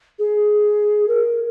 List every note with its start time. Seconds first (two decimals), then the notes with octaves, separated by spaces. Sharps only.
0.19 G#4
1.08 A#4